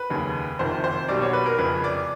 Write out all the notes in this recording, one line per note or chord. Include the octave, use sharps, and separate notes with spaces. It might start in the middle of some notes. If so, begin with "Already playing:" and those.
Already playing: B4
F1 D#2 C#3
F#1 F2 C3 D#3 C5
C5
B1 B2 G3 D5
C#5
B4
A#4
F1 F2 C#3 B4
D5